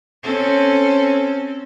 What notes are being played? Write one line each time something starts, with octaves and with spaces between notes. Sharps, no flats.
C4 C#4 A4